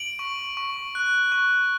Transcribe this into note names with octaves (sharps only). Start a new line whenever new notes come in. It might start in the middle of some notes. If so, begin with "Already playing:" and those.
Already playing: D7 F#7
C#6
C#6
F#6
C#6